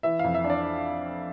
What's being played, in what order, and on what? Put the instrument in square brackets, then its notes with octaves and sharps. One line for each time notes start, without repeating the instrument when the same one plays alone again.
[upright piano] E3 E5
F2 F5
E5
D4
D5